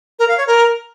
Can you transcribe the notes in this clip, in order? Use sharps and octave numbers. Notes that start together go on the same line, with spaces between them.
A#4
F5
C#5
A#4